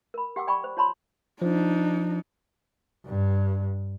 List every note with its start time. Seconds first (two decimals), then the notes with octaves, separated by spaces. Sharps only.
0.14 A#4 B5
0.36 G4 F#5 G5 D6 E6
0.47 D5 G5 B5 C#6
0.64 C5
0.77 F4 C#5 A5 B5 C6
1.42 F3 D4 D#4
3.06 G2